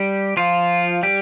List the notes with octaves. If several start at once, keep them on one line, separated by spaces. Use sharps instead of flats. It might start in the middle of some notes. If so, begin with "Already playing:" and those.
Already playing: G3 G4
F3 F4
G3 G4